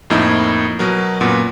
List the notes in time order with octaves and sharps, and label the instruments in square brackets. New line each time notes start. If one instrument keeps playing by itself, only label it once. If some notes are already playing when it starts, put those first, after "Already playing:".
[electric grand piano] F2 A2 A#3 D#4 E4
B2 F#3 A#4
F#2 A#2 F#3 B3